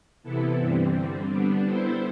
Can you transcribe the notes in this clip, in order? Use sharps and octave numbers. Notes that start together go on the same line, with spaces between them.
C3 E3 B3 E4 A4
G2 E3 G3 C4
D3 G3 C4
D3 G3 B3 D4
G3 B3 E4 A4 C5